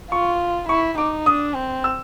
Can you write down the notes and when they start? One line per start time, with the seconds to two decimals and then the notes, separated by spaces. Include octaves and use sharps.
0.12 F4 C#6
0.69 E4 C#6
0.98 D#4 D6
1.26 D4 D#6
1.55 C4
1.84 E6